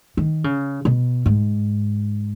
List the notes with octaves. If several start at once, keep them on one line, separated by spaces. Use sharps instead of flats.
D#3
C#3
B2
G#2